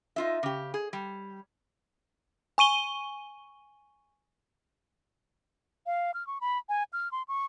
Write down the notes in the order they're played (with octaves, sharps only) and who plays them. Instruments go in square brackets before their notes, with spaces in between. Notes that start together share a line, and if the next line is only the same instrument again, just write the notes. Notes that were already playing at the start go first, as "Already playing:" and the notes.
[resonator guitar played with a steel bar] D#4 F4 E5
C#3 G4
G#4
G3
[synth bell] G#5 C#6 D#7 G7
[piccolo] F5
F6
C#6
B5
G#5
F6
C6
C#6